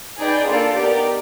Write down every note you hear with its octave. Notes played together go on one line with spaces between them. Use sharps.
D#4 G#4 B4 D5 G5
A#3 D4 F4 A4 D5
B3 D#4 G4 A#4 D5